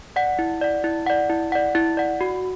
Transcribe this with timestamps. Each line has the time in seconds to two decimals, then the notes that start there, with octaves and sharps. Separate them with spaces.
0.16 D5 F#5
0.39 E4
0.61 D5 F#5
0.84 E4
1.06 D5 F#5
1.30 E4
1.52 D5 F#5
1.75 E4
1.97 D5 F#5
2.21 F#4